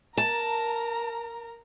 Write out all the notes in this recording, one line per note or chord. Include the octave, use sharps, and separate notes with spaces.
A#4 A5 A#5